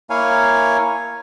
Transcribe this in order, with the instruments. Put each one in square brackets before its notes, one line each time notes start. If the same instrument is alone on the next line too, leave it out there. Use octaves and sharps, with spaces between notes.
[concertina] A#3 E4 C#5 F5 G#5